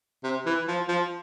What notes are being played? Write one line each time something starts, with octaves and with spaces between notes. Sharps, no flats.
C3
E3
F3
F3